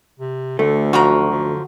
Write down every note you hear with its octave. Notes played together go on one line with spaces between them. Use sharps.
C3
D2 D3 A3
F#2 F3 F#4 A#5
D3